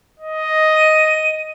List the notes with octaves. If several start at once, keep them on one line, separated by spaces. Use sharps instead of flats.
D#5
D#7